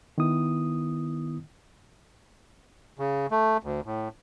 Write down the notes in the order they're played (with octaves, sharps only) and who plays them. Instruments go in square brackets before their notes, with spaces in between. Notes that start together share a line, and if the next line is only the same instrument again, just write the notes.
[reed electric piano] D#3 B3 E4 D#6
[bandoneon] C#3
A3
D2
A2